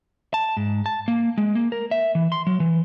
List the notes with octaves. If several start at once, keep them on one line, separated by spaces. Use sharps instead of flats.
A5
G#2
A5
A#3
G#3
A#3
A#4
E5
E3
C6
F#3
E3